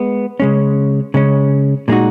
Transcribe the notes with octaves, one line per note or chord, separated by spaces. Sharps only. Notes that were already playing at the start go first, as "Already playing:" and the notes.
Already playing: G#3 B3
C#3 G#3 C#4
C#3 G#3 C#4
A#2 G#3 D#4 F#4